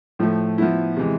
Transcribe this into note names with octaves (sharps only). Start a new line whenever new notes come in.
A2 F3 A3
F3 B3 E4
C3 E3 G#3